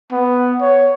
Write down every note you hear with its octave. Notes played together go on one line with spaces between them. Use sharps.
B3
C#5